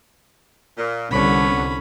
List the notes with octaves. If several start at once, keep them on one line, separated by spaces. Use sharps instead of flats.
A#2
C2 D3 B3 C#4 C#5 B5